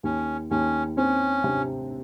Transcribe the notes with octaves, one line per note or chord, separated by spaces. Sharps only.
D#2 C#4
D#2 C#4
C4 C#4
C3